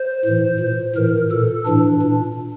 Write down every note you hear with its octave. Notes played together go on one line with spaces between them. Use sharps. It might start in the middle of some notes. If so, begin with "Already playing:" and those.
Already playing: C5
A2 E3
A#2
A2 E3 A#4
A#2 A4
A2 E3 D4
A#2